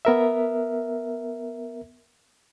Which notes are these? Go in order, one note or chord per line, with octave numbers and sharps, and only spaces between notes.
B3 A#4 E5